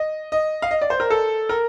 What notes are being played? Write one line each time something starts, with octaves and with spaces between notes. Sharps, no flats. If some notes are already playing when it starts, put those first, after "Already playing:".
Already playing: D#5
D#5
F5
D#5
D5
C5
A#4
A4
A#4